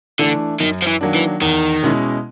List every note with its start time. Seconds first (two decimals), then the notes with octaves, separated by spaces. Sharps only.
0.19 D3 E3 A3 D4
0.60 F#2 D#3
0.83 F3
0.87 E3
1.01 D#3 F#3 A#3 D4
1.15 E3
1.42 E2 D#3
1.83 B2 G#3 C#4 E4